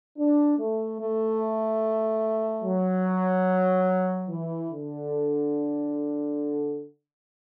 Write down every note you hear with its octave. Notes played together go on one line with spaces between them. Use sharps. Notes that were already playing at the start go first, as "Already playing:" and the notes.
D4
A3
A3
F#3
E3
D3